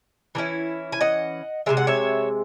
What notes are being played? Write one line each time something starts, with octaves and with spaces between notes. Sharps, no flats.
E3 A3 C#4 E4
G#5
D#5 F#5
C3 E3 G#3 E5
F#5
C#5 E5